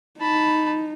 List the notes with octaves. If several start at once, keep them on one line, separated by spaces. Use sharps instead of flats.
D#4 A5 B5